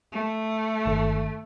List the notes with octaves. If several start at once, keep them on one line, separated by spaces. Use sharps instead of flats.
A3
G1 D#3 A4